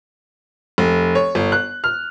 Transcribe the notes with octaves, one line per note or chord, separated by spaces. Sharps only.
F1
C#5
G1
F#6
F6